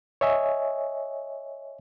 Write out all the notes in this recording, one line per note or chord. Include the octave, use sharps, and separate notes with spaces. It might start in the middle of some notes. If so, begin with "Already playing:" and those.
C#5 D#5 E5 G#5